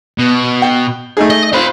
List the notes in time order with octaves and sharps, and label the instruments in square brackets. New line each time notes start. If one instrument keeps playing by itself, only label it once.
[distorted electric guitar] B2
[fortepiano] G5
A3 D#4 G#4
[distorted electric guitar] D#5
[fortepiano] C4 F4 [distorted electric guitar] C5 B5